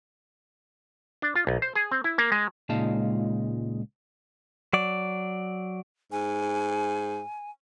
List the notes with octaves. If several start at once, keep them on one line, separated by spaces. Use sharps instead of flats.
D4
F4
B1
C5
G#4
C4
E4
A#3
G#3
C#2 A#2 G#3 D#4 F5 A5
F#3 D5
G#2 G#5